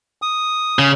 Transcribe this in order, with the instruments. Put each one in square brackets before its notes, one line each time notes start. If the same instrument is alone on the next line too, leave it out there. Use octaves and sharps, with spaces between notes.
[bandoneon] D#6
[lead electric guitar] C#3